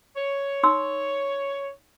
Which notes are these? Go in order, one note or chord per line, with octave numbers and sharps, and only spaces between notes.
C#5
D#4 C6 E6